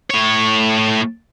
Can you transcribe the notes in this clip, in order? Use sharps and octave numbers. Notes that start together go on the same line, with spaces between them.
A2 C#5